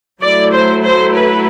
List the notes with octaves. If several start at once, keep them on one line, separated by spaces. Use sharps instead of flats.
F#3 A3 E4 D5
C5
C5
B4